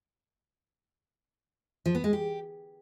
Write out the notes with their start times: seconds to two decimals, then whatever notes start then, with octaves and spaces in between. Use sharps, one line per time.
1.86 F3
1.95 B3
2.04 G#3
2.13 G4